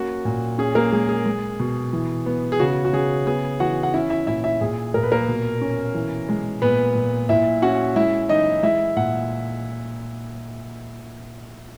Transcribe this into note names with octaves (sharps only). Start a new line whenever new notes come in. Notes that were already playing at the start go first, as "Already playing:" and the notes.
Already playing: A#3 C#4 F#4
A#2
C#4 G#4
A#3 A#4
G#3 G#4
G#4
G#3
B2
E3
B3
G#4
C#3 F#4
F#4
C#3 G#4
B3 G#4
E3 F#4 F#5
F#5
C#4 E4 E5
E4 E5
A#2 E4 E5
E4 E5
A#2 G#4
A#2 A#4
B4
A#3 A#4
B2
C#4
E3
G#3
A#2 B3 B4
A#2
A#2 E4 E5
C#4 F#4 F#5
G#3 E4 E5
E3 D#4 D#5
G#3 E4 E5
A#2 F#5